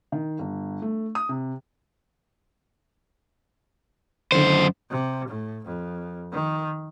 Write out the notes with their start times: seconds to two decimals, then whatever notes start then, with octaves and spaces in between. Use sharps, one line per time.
0.12 D#3
0.39 G1
0.82 A3
1.15 D#6
1.29 C3
4.32 F#2 D3 D#3 C5
4.91 C3
5.28 A2
5.65 F2
6.32 D#3